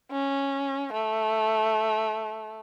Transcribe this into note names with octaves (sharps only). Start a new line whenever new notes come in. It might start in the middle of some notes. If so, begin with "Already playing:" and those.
C#4
A3